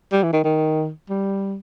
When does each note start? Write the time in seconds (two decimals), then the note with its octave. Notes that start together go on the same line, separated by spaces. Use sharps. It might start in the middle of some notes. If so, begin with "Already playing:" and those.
0.12 G3
0.23 E3
0.33 D#3
0.44 D#3
1.10 G3